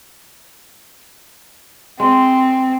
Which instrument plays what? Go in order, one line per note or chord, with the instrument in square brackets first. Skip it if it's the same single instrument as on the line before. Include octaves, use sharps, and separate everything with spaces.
[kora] G#3 [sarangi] C4